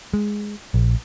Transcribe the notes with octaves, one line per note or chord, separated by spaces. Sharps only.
G#3
A#1